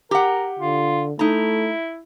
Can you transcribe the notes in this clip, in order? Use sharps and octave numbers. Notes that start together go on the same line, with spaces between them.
G4 A#4 F#5
D3 F4
A3 D#4 E4 A#5